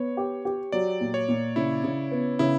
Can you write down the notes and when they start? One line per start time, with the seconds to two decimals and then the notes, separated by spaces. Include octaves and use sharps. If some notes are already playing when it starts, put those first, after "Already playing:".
Already playing: B3 C#5
0.17 G4
0.45 G4
0.72 F#3 D5
1.01 A#2
1.14 C#5
1.28 A#2
1.56 C#3 E4
1.84 C#3
2.11 B3
2.39 C#3 E4